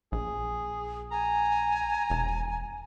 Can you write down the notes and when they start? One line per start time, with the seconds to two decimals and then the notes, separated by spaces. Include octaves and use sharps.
0.12 A#1 G#4
1.11 G#5 A#5
2.10 E1